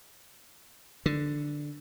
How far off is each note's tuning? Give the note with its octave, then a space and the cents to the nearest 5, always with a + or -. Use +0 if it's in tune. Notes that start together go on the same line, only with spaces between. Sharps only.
D3 +5